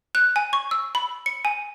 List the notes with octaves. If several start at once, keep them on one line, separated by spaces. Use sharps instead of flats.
F#6
G#5
C#6
E6
B5
C#7
G#5